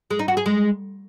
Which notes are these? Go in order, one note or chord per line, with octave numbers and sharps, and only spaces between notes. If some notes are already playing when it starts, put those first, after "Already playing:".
G#3
D#4
F#4
G#4
G#3